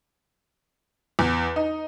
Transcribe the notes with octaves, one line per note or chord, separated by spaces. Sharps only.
E2
D#4